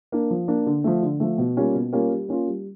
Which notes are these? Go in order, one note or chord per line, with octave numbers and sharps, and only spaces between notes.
A#3 D4
F3
A#3 D4
D3
F3 A3
D3
F3 A3
B2
G3 A#3 C#4 F4
B2
G3 A#3 C#4 F4
G3
A#3 C#4 F4
G3